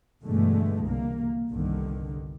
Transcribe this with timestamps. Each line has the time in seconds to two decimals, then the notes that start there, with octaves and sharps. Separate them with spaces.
0.23 G2 B2 D3 E3 G#3 A3
0.86 C2 A#3
1.51 G1 C2 D3 D#3